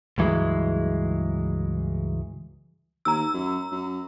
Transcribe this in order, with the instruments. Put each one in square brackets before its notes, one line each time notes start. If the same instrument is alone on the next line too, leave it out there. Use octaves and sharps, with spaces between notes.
[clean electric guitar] C#2 G2 E3 F#3 G#3
[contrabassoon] D#2 [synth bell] A#5 E6
[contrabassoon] F#2
F#2